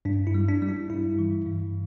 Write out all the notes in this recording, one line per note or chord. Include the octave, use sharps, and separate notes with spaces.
G2 D4
E4
G3
D4
G3
E4
G2 E4
E3
G2